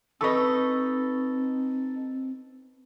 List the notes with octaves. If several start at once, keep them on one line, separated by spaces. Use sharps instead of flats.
C4 D#4 A4 B4 C#6 D#6